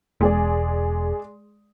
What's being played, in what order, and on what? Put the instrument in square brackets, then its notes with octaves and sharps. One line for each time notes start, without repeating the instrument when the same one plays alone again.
[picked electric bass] E1 [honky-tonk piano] G#3 G#4 D5